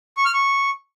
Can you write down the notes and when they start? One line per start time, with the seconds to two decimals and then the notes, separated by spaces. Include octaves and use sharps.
0.17 C#6
0.25 F6
0.34 C#6